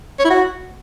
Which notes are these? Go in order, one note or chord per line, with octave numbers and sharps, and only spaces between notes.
C#5
E4
F#4